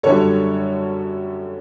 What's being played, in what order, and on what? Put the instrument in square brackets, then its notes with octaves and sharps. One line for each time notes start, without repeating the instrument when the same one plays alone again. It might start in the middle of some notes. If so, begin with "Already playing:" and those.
[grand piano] F#2 D3 G3 A4 C#5